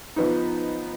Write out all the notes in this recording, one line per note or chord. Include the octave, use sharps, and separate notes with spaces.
F3 B3 D#4